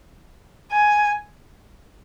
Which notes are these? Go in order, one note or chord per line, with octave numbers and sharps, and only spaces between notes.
G#5